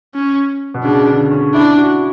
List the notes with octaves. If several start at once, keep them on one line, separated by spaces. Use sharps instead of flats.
C#4
B2
C#3 D4
D3
C#4
D4 E4
F#4